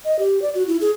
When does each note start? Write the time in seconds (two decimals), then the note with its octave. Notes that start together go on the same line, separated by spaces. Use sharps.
0.05 D#5
0.19 G4
0.42 D5
0.55 F#4
0.67 E4
0.81 G#4